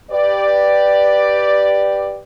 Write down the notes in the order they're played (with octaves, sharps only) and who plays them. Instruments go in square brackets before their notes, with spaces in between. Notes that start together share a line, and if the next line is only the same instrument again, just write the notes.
[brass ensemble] G4 B4 D5